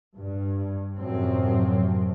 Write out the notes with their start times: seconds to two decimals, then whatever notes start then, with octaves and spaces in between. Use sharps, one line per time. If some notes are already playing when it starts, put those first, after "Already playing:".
0.16 G2
0.98 F#2 A2 C3 F3 F#3 C4